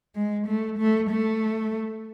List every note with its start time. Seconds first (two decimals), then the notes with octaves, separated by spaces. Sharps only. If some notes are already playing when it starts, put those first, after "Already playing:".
0.15 G#3
0.47 A3
0.78 A3
1.10 A3